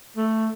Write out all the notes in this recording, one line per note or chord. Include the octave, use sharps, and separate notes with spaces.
A3